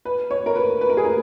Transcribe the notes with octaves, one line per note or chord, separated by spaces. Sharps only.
B4
C#5
A#4
B4
B4
A#4
G#4
A#4